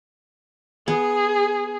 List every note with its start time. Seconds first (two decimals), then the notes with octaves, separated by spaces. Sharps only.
0.88 B3 G#4